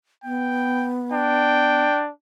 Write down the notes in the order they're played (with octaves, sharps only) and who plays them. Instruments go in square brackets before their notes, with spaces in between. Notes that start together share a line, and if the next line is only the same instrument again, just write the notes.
[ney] B3 [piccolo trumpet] G5
[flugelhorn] D4 [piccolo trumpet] G5